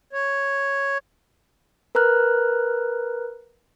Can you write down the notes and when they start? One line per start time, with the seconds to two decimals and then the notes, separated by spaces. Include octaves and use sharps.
0.13 C#5
1.95 A#4 B4 A#5 F6 F#6